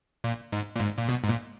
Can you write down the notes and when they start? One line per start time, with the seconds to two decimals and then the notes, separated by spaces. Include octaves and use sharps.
0.24 A#2
0.52 G#2
0.76 A#2
0.80 G#2
0.97 A#2
1.09 B2
1.24 G#2
1.29 A#2